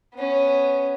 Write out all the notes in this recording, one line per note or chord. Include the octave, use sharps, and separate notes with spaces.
B3 C#4